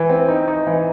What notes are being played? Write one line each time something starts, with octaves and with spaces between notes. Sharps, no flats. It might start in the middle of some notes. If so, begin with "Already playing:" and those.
Already playing: E3
C4
D#4
D#4
E3